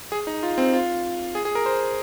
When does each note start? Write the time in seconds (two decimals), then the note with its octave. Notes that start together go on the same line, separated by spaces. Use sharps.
0.12 G#4
0.27 D#4
0.43 F4
0.58 C4
0.73 F4
1.35 G#4
1.45 G#4
1.55 A#4
1.66 C5